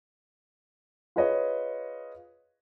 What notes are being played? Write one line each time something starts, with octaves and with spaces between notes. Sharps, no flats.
F4 G#4 B4 C#5 D#5